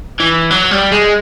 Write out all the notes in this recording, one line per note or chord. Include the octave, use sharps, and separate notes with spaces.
E3
F#3
G3
G#3